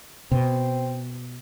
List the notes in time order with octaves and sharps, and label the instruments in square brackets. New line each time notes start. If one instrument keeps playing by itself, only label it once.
[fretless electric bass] B2 [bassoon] C4